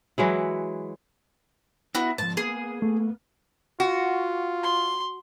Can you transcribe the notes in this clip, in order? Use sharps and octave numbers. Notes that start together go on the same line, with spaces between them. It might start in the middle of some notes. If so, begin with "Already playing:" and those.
E3 F#3 G#3 E4
B3 E4 F#4
G#2 F3 A5
A#3 B3 G#4
A3
F4 F#4
C6